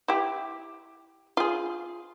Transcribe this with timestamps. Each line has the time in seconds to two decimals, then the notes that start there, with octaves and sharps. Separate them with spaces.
0.08 E4 G4
1.37 F4 G#4